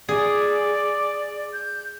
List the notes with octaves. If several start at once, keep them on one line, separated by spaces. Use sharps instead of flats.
G#4 D5
G6